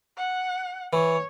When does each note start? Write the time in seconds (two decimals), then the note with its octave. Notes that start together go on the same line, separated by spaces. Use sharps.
0.18 F#5
0.93 E3 C#5